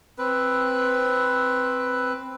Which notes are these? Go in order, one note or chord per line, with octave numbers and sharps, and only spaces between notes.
C4 B4